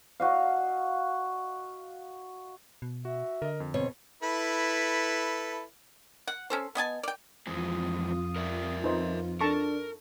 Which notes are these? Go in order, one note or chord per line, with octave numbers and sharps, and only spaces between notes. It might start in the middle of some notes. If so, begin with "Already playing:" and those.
F#4 D#5 F5
B2
F#4 E5
D3 A#4 D#5
F2
B2 C4 C#5
E4 A4 B4
F#5
C#4 A4 C5
B3 D#5 G#5 A5
D5 G5
F2 G#2 E3 C4 F4 D#6
A#4 D5 E5
D#4 B4 C5
D4 A4 A#4 A5 C#6